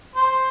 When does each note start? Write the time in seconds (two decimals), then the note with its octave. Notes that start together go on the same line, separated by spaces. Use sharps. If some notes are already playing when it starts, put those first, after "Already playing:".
0.16 C5